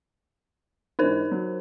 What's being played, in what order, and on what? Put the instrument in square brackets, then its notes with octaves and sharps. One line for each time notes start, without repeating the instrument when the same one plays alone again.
[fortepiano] G#2 E3 D4 [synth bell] D#4 A#4 C5
[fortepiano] F#3